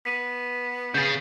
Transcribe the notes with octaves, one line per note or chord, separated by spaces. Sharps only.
B3 B6 D#7
C#3 G#4 G6 A6